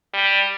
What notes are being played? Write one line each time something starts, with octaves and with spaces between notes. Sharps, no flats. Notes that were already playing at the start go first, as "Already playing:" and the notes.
G3